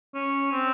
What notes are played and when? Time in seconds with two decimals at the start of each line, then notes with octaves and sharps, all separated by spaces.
0.14 C#4
0.52 C4